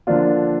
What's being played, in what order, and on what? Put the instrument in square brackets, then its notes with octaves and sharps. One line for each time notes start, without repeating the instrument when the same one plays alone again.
[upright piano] D3 F3 A#3 D4 F4